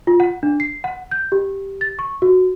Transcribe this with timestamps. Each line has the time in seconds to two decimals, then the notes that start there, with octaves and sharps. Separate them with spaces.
0.07 F4
0.20 F#5
0.43 D4
0.60 C7
0.84 F#5
1.11 G6
1.32 G4
1.81 A6
1.99 C#6
2.22 F#4